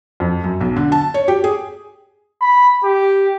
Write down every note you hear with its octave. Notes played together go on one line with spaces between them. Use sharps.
F2
F#2
B1
D3
A5
C#5
G4
G#4
B5
G4